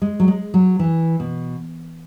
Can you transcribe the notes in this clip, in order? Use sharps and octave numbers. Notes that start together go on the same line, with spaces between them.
G#3
F#3
G#3
F#3
E3
B2